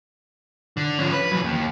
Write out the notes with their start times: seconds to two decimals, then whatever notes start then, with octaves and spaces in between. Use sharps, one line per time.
0.77 D3
0.99 F3 C#4
1.12 B4
1.31 E3 F#3
1.44 D#2